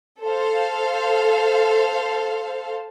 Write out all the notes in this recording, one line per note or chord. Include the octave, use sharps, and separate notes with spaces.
A4 C5 F5